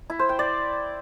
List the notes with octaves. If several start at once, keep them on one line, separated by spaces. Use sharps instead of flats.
E4
C5
G5
D5